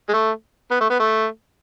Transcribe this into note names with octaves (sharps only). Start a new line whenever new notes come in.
G#3
A3
B3
A3
B3
A3